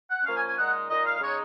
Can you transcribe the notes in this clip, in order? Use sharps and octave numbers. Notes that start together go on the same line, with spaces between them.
F#5
F3 A#3 C#4 F5
G#5
G#5
A#2 G#3 D#4 F#5
A#2 G#3 D#4 D#5
F5
C#3 G#3 D#4 C#5